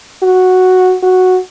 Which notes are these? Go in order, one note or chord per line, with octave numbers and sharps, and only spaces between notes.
F#4
F#4